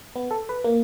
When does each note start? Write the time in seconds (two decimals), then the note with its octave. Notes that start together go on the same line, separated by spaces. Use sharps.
0.15 B3
0.31 A4
0.49 B4
0.64 A#3